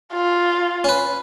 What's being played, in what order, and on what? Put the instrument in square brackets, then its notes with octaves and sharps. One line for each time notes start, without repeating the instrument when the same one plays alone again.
[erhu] F4
[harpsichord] C#4 B4